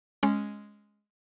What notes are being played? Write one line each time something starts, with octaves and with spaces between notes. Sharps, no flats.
G#3 C#4